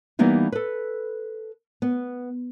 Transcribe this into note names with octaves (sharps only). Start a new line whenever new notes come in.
E3 G3 A#3 B3 D#4 E4
A4 B4
B3